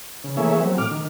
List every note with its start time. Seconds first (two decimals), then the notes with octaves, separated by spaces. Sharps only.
0.24 C#3
0.37 E3 A3 A#3 G#4 C#5 E5
0.60 F#3 C4
0.78 A2 D6 F6
0.91 D#3